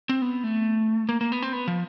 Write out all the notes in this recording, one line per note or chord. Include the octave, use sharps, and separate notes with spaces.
C4
B3
A3
A#3
A#3
B3
C4
B3
F3